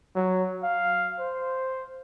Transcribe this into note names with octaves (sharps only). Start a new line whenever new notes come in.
F#3
F5
C5